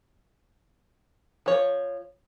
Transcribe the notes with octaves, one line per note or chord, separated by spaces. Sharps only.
F3 C#5